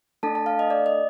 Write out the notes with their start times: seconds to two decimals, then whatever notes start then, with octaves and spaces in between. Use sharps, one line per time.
0.23 A3 D4 A4 A5
0.35 A5
0.46 F5
0.59 D#5
0.70 D5
0.86 D#5